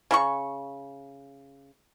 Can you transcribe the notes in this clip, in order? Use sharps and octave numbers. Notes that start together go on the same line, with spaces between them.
C#3 F4 C#6